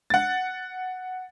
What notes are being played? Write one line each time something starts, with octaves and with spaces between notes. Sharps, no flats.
F#5 A6